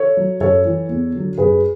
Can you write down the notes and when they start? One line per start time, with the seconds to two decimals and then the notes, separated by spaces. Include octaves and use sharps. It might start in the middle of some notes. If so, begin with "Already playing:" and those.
Already playing: A4 C#5
0.17 F#3
0.40 F#2 A4 C#5
0.65 E3
0.89 E2
1.13 D3 F#3
1.38 F#2 G#4 B4